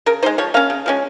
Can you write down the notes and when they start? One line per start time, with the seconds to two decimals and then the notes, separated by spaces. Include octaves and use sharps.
0.06 C#3 A#4
0.22 D#4 C5
0.26 G#3
0.38 F3 C#5
0.54 A#3 C#4 F5
0.70 C#3
0.86 F3 G#3 C#4